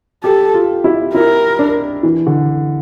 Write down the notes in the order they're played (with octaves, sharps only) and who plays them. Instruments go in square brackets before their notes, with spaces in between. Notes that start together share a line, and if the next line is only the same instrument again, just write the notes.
[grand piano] G4 [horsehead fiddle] A4
[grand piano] F4
E4
[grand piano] E4 [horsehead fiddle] A#4
[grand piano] D4
E3
D3